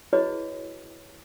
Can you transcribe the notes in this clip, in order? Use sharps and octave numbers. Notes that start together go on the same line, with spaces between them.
E4 F#4 G#4 B4 C#5 D#5